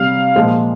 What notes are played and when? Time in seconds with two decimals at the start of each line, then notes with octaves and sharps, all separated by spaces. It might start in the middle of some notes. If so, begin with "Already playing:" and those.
Already playing: C3 G3 F5
0.36 A#2 F3 G#3